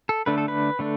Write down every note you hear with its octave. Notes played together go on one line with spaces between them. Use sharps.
A4
D3 A3 D4 B4
A4
B4
D3 A3 D4